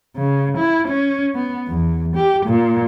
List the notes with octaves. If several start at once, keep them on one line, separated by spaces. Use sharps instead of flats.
C#3
E4
C#4
B3
E2
G4
A#2